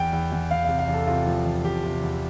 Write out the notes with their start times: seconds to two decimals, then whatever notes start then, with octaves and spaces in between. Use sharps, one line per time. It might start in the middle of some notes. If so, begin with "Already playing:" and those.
Already playing: E2 G5
0.13 E2
0.32 E2
0.50 E2 F5
0.65 C3 F5
0.79 F5
0.88 E2
0.94 A4
1.07 C3 F4
1.26 F3
1.45 E2
1.64 E2 G4
1.83 C3
2.02 E2